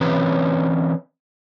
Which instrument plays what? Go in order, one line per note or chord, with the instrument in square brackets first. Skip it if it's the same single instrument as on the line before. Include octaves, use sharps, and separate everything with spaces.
[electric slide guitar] E3 C4 C#4 B4 C#5